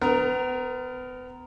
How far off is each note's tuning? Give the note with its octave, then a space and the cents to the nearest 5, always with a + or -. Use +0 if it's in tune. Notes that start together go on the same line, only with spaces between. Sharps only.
B3 +35 A#4 +0